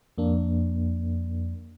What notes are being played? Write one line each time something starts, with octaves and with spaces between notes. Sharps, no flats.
F2 A#3 D4